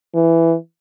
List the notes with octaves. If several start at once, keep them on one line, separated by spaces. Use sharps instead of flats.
E3